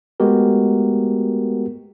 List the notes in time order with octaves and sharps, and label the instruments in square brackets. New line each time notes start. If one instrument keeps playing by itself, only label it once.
[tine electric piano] G#3 A3 B3 F#4 G4 A#4